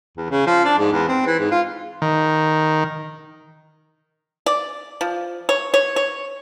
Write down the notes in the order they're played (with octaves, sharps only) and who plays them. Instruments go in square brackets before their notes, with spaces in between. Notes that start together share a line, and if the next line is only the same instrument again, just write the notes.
[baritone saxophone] E2
C#3
F3
D4
G#2
E2
C4
E3
G#2
F4
[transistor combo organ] D#3
[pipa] D5
F3
C#5
C#5
C#5